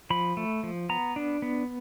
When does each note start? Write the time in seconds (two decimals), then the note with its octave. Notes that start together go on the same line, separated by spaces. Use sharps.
0.10 F3 B5
0.37 A3
0.63 F3
0.89 B3 A#5
1.16 D4
1.42 B3